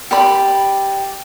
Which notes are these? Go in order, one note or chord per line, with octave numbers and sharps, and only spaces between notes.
G4 D5 B5